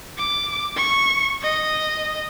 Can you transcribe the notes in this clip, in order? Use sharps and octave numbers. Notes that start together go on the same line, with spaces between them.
D6
C#6
D#5